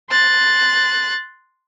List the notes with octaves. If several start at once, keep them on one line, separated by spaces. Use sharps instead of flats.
C6 F#6 A6